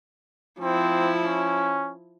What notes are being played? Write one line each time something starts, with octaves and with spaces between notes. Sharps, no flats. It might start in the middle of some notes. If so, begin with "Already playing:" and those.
F3 C4 E4
C#4